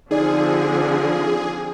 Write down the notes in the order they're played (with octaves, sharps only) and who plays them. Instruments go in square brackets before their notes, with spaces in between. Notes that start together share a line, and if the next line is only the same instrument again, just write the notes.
[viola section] D3 F3 C4 [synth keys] D#4 D5 [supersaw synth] G#4